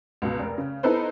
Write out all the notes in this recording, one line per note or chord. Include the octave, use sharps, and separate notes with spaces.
C#2 B2
F1 A#4
C#3
B3 D#4 E4 A4 B4 C5